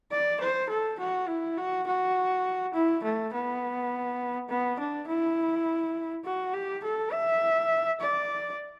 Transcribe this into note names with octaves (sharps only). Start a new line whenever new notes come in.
D5
C5
A4
F#4
E4
F#4
F#4
E4
A3
B3
B3
D4
E4
F#4
G4
A4
E5
D5